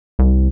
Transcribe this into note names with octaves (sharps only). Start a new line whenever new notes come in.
C2